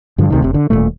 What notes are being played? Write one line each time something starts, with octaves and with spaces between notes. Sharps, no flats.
G2 D3 F3
D2 C3 D#3
F1 C3
D3
D#1 A#2 A3